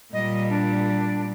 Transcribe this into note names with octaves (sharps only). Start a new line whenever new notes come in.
A#2 G3 D#5
D4